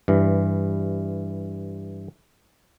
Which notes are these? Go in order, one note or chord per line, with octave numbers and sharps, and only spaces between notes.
G2 E3